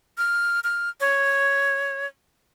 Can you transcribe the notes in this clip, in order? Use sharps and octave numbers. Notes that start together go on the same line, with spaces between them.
F6
F6
C#5